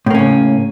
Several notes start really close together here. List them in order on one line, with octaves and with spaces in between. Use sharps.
A2 A#3 C#4 C#3